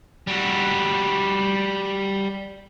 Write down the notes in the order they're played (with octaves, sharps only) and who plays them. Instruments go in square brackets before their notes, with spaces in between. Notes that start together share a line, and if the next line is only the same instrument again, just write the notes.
[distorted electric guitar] G3 F#4